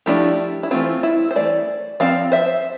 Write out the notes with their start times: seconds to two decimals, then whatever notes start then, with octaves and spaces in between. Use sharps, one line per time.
0.06 F3 A3 D4 E4 G4
0.63 E4
0.71 E3 A3 C4 F4
1.03 E4
1.31 C5
1.36 E3 A3 D5
2.00 F3 C4 D5 F5
2.32 C5 E5